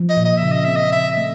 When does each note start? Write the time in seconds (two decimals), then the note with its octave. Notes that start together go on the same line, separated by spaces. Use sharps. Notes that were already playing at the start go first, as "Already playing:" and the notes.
Already playing: F3
0.10 D#5
0.17 A#2
0.25 D#5
0.38 C#3 E5
0.52 D#5
0.65 C4 E5
0.77 D#5
0.92 C#3 E5
1.17 A3